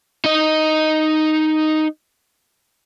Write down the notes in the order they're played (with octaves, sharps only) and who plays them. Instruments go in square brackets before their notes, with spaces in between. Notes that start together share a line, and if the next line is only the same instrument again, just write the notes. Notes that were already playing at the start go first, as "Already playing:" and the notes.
[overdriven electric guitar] D#4 D#5